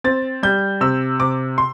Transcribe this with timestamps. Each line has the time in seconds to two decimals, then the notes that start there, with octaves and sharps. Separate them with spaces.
0.04 C4 A6
0.43 G3 G6
0.81 C3 E6
1.20 C3 D6
1.58 C6